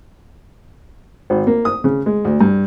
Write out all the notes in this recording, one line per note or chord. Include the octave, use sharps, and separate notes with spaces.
G#1
A#3
D#6
C#3
G#3
D2
G2